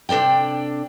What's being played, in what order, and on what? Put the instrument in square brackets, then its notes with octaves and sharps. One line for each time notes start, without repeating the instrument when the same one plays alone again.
[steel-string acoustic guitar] C3 D4 A4 D5 G5